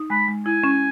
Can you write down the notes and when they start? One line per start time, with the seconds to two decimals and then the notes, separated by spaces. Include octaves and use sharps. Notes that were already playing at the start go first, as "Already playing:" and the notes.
Already playing: D#4
0.10 G#3 B5
0.28 G#3
0.46 E4 G#5
0.64 C#4